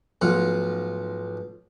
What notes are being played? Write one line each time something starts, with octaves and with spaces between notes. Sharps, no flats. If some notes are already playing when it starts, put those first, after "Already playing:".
B1 G#2 F3 A3 F4 F#5